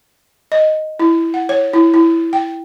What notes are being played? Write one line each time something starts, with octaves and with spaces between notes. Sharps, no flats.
D#5
E4
F#5
C#5
E4
E4
G5